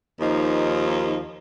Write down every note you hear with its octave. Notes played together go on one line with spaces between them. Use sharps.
D#2 F3 D#4